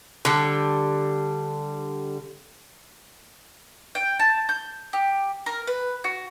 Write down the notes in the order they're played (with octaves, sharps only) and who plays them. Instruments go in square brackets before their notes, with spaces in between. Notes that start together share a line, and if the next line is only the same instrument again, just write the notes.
[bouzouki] D3 G3
[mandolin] G5
A5
G6
G4
A#4
B4
F#4